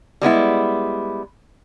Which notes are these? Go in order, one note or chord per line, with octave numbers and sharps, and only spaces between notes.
G3 G#3 B3 E4